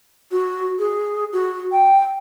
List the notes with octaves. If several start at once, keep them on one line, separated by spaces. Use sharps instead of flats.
F#4
G#4
F#4
G5